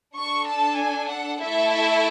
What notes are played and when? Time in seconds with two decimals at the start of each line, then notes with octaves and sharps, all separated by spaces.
0.17 D4 A4 C#6
0.48 A5
0.80 G#5
1.10 F#5
1.41 A3 E4 A4 E5
1.72 E5